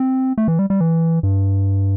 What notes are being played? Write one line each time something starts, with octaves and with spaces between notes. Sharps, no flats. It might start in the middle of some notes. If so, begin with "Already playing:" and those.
Already playing: C4
A3
E3
G3
G3
E3
G2